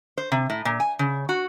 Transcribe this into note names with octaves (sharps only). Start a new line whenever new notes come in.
C5
C3
A2
A#2
G#5
C#3
F#4